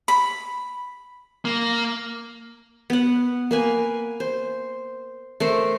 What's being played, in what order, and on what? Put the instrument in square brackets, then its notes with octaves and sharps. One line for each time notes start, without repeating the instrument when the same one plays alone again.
[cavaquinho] B5
[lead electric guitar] A#3
[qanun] B3 F#5
A#3 B4 G#5
C5
A3 A#4 C5